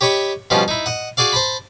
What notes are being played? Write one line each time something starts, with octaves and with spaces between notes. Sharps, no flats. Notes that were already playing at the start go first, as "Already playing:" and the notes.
G4 C#5 D#5 B5 C#6
B2 F3 G3 C#4 F4
D#4 E4
D#5 F#5
F#4 G#4 D5 F5
C5 A5 B5